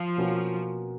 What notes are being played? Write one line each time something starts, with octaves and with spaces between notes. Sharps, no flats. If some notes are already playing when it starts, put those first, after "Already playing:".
Already playing: F3
B2 A#3 C#4 F#4